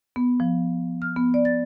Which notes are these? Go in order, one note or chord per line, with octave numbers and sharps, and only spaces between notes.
B3
F3
F6
B3
D5
A6